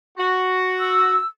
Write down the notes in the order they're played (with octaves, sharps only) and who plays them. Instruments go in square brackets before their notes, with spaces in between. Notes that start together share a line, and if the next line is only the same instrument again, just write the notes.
[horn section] F#4
[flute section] E6